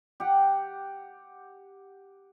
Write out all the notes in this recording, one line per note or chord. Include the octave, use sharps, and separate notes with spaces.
G4 F#5